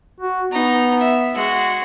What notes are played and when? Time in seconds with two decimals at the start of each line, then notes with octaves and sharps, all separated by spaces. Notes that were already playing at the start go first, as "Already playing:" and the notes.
0.20 F#4
0.52 B3 D#4 A#5
0.99 E5
1.34 G#3 F#4